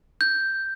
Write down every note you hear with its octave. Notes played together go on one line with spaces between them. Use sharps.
G6